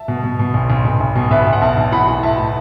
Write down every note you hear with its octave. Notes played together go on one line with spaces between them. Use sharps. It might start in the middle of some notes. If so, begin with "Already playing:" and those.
Already playing: E5 A5
B2
B2
B2
B1
B1
B1
B1
B2
B1 B4 E5
B1
F#5
B1 E5 A5
B1
E3 F#5 B5
B1
A2 E5 A5
A2